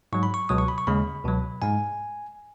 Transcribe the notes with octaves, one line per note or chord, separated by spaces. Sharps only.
G#2 F#3 C#6
B5
C#6
C#2 B2 F#3 D#6
C#6
B5
C#6
D#2 C#3 G#3 B5
C#2 B2 F#3
G#2 G#3 G#5